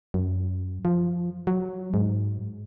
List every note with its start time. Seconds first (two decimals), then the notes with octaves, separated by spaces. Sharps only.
0.14 F#2
0.85 F3
1.47 F#3
1.94 G#2